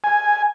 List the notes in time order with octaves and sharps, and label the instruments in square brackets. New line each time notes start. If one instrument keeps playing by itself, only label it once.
[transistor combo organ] G#5